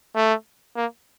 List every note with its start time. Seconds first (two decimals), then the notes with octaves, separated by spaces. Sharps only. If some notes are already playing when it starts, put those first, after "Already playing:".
0.15 A3
0.76 A#3